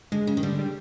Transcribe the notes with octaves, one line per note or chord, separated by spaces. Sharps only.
D3 G#3
C#3
D#3
D3 G3
G3